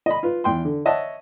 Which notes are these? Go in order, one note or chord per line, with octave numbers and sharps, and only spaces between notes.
D#5 B5
F4 B4
E2 G5 C6
D3
C#5 D#5 E5 F#5 A5